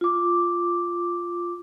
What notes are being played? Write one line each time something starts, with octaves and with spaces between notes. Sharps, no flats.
F4 D6